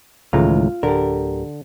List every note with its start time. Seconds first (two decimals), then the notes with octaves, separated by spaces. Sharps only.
0.33 C#2 A2 D#3 E3 G#3 F4 A#5
0.83 D1 D3 G4 A#4